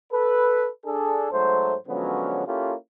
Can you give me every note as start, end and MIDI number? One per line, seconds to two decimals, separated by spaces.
0.13 0.67 69
0.13 0.67 71
0.86 1.31 62
0.86 1.31 68
0.86 1.31 69
1.32 1.74 44
1.32 1.74 54
1.32 1.74 57
1.32 1.74 72
1.87 2.43 50
1.87 2.43 53
1.87 2.43 54
1.87 2.43 56
1.87 2.43 59
1.87 2.43 61
2.46 2.74 58
2.46 2.74 61
2.46 2.74 64
2.46 2.74 65
2.46 2.74 67
2.46 2.74 69